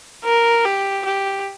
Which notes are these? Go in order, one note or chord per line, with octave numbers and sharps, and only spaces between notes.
A#4
G4
G4